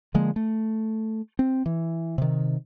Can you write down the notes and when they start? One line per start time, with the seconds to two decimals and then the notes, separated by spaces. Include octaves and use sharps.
0.14 D3 F3 G#3 A#3
0.36 A3
1.39 C4
1.66 E3
2.18 C3 D#3